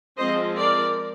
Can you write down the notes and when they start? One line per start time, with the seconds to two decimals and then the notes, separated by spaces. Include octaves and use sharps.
0.18 F3 G#3 C4 C5 D#5
0.56 A#4 D5